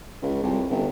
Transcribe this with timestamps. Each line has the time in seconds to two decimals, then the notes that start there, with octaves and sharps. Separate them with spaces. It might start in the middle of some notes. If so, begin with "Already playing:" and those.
0.22 C#2
0.43 C2
0.70 G1